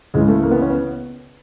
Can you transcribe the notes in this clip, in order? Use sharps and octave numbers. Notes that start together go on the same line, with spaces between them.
C#2 C#3 E3 G#3
A3
A#3
B3
C#4
B3